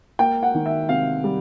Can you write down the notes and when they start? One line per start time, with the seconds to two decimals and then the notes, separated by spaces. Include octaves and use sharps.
0.19 A#3 G5
0.43 F#5
0.55 D#3
0.66 E5
0.89 C3 F5
1.24 G3